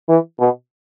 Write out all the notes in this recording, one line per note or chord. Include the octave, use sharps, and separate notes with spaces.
E3
B2